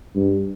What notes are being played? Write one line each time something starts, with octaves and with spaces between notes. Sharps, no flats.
G2